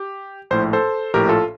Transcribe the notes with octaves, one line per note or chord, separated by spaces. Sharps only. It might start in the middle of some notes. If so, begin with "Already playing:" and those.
Already playing: G4
A#1 A2 C5
A4 C5
A#1 A2 G4 A#4
F4 A4